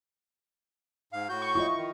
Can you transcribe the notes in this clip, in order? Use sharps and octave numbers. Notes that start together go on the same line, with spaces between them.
G#2 F5
A2 F#4 G6
C#6
E4 F4 D#5 C#6
D#3